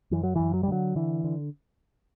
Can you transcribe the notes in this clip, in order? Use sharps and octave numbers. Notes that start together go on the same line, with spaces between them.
F#2 E3
F#3
F#2 E3
F#3
G3
D3 F#3
D3 E3
D3